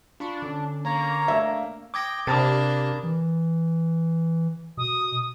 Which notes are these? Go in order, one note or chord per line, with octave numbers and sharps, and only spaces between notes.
D4 F4 B5 C#6
D3 C#4
A#3 C#5 A#5
A3 D4 E5
G5 D6 D#6 G#6 A#6
C3 A#3 D4 A#4 A5 B5 D#6 A6
E3
B2 D#6